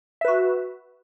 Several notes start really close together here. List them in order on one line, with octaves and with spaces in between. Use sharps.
E5 B4 F#4